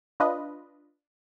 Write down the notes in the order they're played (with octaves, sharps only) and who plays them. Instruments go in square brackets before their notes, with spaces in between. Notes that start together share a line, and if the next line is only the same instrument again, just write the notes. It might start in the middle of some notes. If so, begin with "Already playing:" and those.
[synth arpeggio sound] D4 F4 B4 D#5